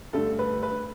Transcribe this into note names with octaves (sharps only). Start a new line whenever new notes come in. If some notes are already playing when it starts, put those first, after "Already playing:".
G2 D3 A3 A4
B4
B4